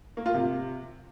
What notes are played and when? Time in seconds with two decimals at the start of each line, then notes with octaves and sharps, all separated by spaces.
0.17 A#3
0.26 F4
0.34 C3